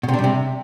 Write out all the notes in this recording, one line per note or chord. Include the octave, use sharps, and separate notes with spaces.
B2
C3
D4
G3
C3